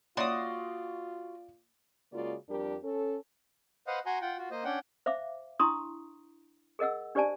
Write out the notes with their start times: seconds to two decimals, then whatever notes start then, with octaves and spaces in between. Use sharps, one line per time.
0.17 A#3 F4 F#4 C#5 D5 E5 C6 D#6
2.13 C#3 G#3 A#3 F4 F#4 D5
2.49 F2 G3 D4 G4 A#4
2.84 C#4 A4
3.87 B4 C5 D#5 F5 F#5
4.06 F#4 F#5 G#5 A#5 C6
4.21 F4 F#5 G5
4.38 F4 F#4
4.51 A#3 C5 D#5
4.64 C#4 D4 F#5 G5
5.06 C5 E5 F5 D6
5.60 D4 E4 A#5 C6 C#6 D#6
6.79 G#4 A#4 D#5 F#5 E6
7.15 D4 G4 C5 D5 G#5 A5